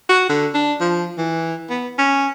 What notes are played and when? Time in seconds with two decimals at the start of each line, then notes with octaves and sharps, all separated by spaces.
0.09 F#4
0.29 D3
0.54 D4
0.80 F3
1.18 E3
1.70 B3
1.98 C#4